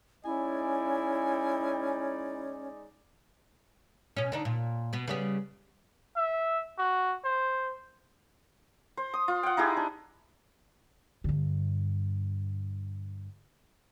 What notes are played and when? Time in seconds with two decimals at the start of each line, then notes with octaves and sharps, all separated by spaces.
0.25 G#3 C#4 D#4 E4 D5 G#5
4.17 B2 C#4
4.32 D3 D4 D#4
4.45 A#2
4.93 B2 B3
5.08 C#3 G3 B3
6.17 E5
6.78 F#4
7.25 C5
8.97 C5
9.14 D#6
9.28 F4
9.43 F#5 G5
9.57 D#4 E4 G4 G#4
9.77 D4
11.24 G2 D3